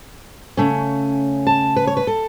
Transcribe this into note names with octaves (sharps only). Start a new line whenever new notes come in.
C#3 A3 C#4
A5
B4
C#5
B4
A4